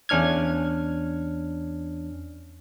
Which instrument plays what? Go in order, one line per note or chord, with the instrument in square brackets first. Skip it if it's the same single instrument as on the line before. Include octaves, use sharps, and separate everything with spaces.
[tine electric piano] E2 C#4 D4 F6 G#6